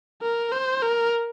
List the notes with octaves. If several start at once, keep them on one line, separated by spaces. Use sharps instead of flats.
A#4
C5
A#4